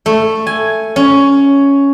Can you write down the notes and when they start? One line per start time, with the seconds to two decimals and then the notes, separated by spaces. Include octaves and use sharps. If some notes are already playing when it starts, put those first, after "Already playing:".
0.06 A3
0.47 G#5
0.96 C#4